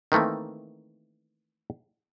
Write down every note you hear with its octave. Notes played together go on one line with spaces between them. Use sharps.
D#3 E3 A3 A#3 C4